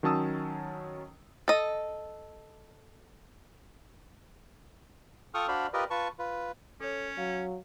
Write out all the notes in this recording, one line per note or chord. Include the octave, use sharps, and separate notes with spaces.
D#3 F#3 C#4 A5 D#6 E6
A4 D#5
F4 A4 G5 C#6 D#6 F6
D4 F#4 C5 D5 F5 B5
F4 G4 A#4 B4 D5 D#5
F4 B4 A5 C#6
F4 B4
C#4 A4 C#5
F#3 F5